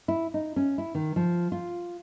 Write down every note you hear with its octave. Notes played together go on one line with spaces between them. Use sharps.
E4
D#4
C#4
E4
D#3
F3
F4